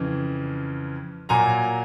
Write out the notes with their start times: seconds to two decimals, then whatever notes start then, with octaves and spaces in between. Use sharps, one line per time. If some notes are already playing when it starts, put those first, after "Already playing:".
Already playing: F2 C#3 E3
1.29 A#2 F#3 G#5 A#5